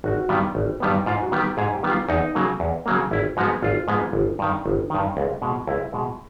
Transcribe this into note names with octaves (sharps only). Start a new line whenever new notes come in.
G#1 F#4
G2 D#3 G3 B3
G#1
G2 D#3 G3 B3
G#2 F4
F#4
D#3 G3 B3
G4
G#2 G#4
G4
D#3 G3 B3
F4
E2 D#4
C#3 F#3 A#3
E2
C#3 F#3 A#3
G#1 E4
G#2 F3 G#3 B3 F#4
G#1 F4
G#2 F3 G#3 B3
G1
G2 D#3
G1
G2 D#3
C#2
B2 G#3
C#2 E4
B2 G#3